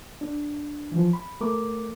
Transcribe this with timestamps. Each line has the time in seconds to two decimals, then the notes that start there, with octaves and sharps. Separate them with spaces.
0.21 D4
0.92 E3 F3
1.13 B5
1.41 A3 A#4 D6